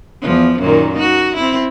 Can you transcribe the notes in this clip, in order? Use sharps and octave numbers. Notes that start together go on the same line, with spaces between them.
E2 F3
F#2 A#2 D#3
D#4 F#4
C4 E4